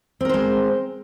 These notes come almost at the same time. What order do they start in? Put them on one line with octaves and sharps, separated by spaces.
C4 A#4 C5 G#3